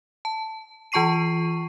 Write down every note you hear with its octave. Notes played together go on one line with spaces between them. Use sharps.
A5
E3 F4 A5 C#6 C7 D#7